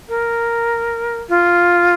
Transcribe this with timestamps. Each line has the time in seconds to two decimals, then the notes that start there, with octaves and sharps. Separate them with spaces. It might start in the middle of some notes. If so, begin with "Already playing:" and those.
0.09 A#4
1.29 F4